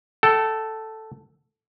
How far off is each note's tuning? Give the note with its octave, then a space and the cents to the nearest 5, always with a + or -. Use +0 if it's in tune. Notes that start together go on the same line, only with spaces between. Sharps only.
A4 +0 G5 -35